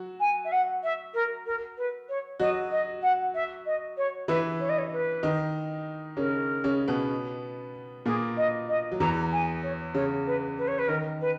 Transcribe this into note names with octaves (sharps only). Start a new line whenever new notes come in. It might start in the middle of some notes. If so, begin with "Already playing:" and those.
Already playing: F#3 F#4
G#5
E5
F#5
E5
A#4
A#4
B4
C#5
F#3 F#4 D#5
D#5
F#5
E5
D#5
C#5
E3 E4 B4
C#5
D#5
C#5
B4
D#3 D#4
C#3 C#4 A#4
C#3 C#4
B2 B3
A#2 A#3 G#4
D#5
D#5
F#3
E2 E3 A#5
G#5
C#5
C#3 C#5
B4
B4
C#5
B4
D#3 A#4
B4